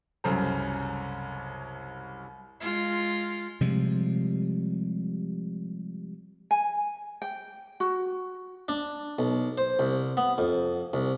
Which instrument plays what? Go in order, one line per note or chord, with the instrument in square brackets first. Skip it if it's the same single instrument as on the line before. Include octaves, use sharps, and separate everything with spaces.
[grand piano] C2 F#2 C#3 A4 C5 A#5
[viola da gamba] G#3 F4
[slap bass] C3 F3 G3 G#3
[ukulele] G#5
G5
F#4
[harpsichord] D4
B1
C5
C2
B3
F2
C2